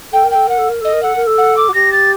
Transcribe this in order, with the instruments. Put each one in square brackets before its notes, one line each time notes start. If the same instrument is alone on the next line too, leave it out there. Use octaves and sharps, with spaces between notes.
[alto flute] A4 [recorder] G5
[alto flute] A#4
[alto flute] A4 [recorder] G5
[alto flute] A#4 [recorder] F#5
[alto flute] A4
A#4
[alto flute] A4 [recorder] D#5
[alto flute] A#4
[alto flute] A4 [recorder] F#5
[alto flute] A#4
A4
[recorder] F#5
D6
[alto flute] F#4
[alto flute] G4 [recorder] A#6
[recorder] A6